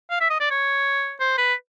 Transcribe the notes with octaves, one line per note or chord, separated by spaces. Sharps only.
F5
E5
D#5
D5
C#5
C5
B4